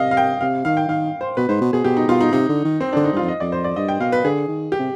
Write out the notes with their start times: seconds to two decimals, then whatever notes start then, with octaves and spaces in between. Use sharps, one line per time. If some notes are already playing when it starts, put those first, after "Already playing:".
Already playing: C3 D#5 F5
0.11 F5
0.17 G5
0.41 C3 F5
0.65 D#3 F5
0.77 G5
0.88 D#3 F5
1.21 C5
1.37 B2 B4
1.49 G#2 C5
1.61 B2
1.73 B2 G#4
1.84 B2 G4
1.97 D#4
2.08 B2 F4
2.21 D#4
2.32 C3 D#4
2.49 D3
2.65 D#3
2.80 C4
2.93 D3 D4
3.04 D#4
3.13 G2 F4
3.22 F2
3.28 D#5
3.40 F2 D5
3.52 C5
3.64 D5
3.76 G2 D#5
3.88 G5
4.00 B2 F5
4.12 B4
4.24 D3 G#4
4.48 D#3
4.72 G4
4.79 C3